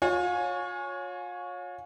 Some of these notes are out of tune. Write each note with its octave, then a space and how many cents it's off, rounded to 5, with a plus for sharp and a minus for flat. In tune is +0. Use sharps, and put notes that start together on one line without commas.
F4 +40 C#5 +0 G#5 +0